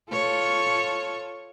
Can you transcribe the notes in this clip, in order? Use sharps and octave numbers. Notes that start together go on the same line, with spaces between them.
F4 A4 C#5